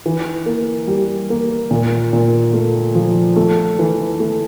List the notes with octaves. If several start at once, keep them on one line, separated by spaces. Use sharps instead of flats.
E3
A#3
G3
A#3
A#2
A#2
A3
F3
A3
E3
A3